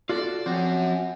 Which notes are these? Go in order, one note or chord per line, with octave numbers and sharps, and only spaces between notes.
F4 F#4 A4 D5
F3 C4 C#4 F#4